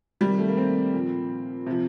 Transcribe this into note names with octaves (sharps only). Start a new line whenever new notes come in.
C3 D#3 G3
A3
A#3
C4
A#2 F3
C3 F3